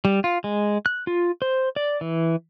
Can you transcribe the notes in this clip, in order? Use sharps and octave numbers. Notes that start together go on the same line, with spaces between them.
G3
F4
G#3
F#6
F4
C5
D5
E3